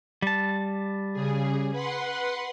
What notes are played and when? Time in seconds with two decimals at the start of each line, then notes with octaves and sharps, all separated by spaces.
0.22 G3 A5
1.13 C#3 G#4
1.72 B4 F#5 C6